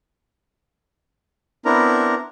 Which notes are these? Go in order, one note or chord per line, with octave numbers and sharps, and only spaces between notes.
B3 C4 D4 E4 A#4 A#5